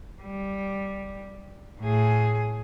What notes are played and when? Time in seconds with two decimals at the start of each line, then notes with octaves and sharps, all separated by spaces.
0.22 G3
1.81 A2 G#4